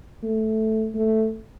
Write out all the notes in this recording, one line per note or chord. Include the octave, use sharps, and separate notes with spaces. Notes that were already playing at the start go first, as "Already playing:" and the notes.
A3
A3